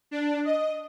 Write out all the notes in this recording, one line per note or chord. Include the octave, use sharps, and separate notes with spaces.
D4
D#5